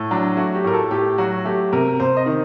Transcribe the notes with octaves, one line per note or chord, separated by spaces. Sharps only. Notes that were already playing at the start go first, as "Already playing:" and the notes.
Already playing: A2
F#3 D4
A3 F#4
G4
A2 A#4
A4
A2 G4
F#3 F#4
A3 G4
C3 A#4
C3 C5
D#5
D#3